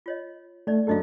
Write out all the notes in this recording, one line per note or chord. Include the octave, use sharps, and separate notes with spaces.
F4 C#5 D#5
A3 C#4 D#4 D5
F#2 D4 G4 A4 D#5 F5